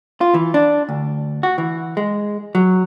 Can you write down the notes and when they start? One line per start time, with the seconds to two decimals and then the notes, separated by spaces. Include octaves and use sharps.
0.21 F4
0.34 E3
0.54 D4
0.89 D2
1.43 F#4
1.58 E3
1.97 G#3
2.55 F#3